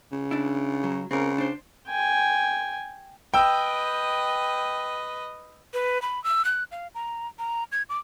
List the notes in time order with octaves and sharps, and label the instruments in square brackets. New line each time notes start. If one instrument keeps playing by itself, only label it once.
[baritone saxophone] C#3
[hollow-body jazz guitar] D4 E4
F#3
[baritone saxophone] C#3 [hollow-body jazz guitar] C4 A#4
[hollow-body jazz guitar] D4 C5
[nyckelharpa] G5 G#5
[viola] B4 D#5 [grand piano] G5 E6
[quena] B4
B5
E6
F#6
F5
A#5
A#5
G#6
D6